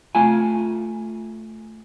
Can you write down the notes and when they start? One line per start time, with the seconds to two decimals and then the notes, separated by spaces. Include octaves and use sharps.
0.15 A3 F4 G#5